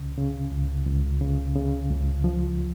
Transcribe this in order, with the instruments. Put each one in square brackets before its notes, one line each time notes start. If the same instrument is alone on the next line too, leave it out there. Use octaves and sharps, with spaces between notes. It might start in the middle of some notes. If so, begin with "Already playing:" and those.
Already playing: [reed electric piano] C#2 C#3
C#3
C#2
C#2
C#3
C#3
C#2
F3